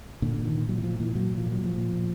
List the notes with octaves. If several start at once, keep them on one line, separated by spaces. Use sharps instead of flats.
A#2 D3
A#2
D#3
A#2
A#2 F#3
E3
A#2 F3
A#2 E3
A#2 F#3
A#2
F3
A#2
F#3
A#2 F3
A#2
A#2